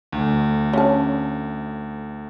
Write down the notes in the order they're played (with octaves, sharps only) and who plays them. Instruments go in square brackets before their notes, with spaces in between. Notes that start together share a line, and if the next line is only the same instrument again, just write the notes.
[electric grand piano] D2
[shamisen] C#4 A5